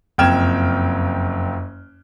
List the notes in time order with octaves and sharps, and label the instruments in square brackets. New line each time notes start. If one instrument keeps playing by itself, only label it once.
[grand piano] F#1 F2 G5 F6 G#6 E7